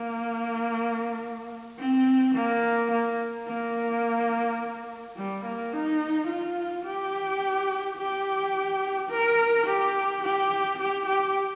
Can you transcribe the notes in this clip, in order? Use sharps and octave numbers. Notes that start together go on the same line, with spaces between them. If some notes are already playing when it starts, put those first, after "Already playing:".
Already playing: A#3
C4
A#3
A#3
A#3
G3
A#3
D#4
F4
G4
G4
A#4
G4
G4
G4
G4